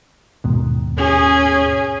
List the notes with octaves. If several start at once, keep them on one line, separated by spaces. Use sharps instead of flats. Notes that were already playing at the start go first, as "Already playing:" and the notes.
D#2 G#2 B2
C#4 G#4